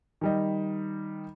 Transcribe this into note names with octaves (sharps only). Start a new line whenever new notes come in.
D#3 G3 D#5